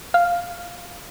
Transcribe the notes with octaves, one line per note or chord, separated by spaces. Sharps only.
F5